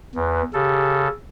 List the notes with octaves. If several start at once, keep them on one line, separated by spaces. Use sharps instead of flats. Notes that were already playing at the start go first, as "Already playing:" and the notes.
E2 B4
C#3 G4 A4